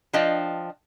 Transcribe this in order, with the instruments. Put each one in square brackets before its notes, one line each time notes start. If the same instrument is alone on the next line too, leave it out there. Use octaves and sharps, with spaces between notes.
[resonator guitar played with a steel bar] F3 D4 D#5 F5 G5